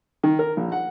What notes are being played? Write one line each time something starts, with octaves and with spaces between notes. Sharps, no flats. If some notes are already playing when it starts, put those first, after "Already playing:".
D#3
A#4
A#1
F#5